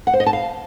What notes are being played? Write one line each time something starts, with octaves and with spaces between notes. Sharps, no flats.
F#5
C5
D#5
A5
F5